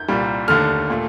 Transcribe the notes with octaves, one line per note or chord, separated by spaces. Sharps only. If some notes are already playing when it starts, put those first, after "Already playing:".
Already playing: G6
C2 A#2 G3
D#2 D3 A3 F6
A#2 A3